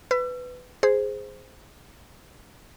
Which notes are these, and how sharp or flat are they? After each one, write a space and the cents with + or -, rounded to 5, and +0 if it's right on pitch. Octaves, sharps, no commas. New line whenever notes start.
B4 +15 E6 +40
G#4 +0 C5 -5